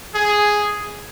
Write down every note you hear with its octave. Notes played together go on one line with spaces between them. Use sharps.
G#4